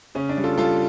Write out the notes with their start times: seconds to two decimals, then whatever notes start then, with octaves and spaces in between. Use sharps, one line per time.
0.15 C#3 C#4
0.29 D4
0.37 G3
0.44 F4 A4
0.58 G3 F4 A4